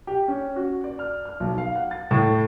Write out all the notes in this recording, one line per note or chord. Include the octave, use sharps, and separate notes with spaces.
G4
C#4
F#4
D5
F6
F6
B1
F5
F#5
A6
A2